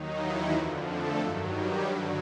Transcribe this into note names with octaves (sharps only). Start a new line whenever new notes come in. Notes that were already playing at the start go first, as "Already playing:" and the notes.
Already playing: D#2 D#3 F#3 D#4
E3 E4
F2 D3 F3
A3 A4
G2 D#3 F#3
G3 G4
G2 D3 F#3